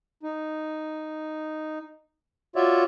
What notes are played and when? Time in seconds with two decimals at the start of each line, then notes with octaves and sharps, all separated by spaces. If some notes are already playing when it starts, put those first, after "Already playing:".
0.23 D#4
2.56 F4 F#4 C#5 D5 E5